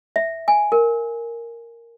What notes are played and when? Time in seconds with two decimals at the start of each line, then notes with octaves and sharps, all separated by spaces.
0.16 E5
0.48 G#5
0.72 A#4